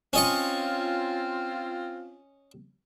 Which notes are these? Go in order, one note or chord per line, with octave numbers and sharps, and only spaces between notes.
C4 C#4 F4 D#5 C#6